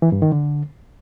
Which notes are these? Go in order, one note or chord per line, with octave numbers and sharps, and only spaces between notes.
E3
G2
D#3
D3